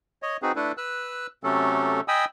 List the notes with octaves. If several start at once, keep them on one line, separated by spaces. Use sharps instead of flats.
C#5 D#5
C4 D#4 F#4 G#4 B4
A3 D4 E4 A4 B4
B4 E6 F#6
C3 F#3 A3 C#4 A4
D#5 G5 G#5 B5 D#6 E6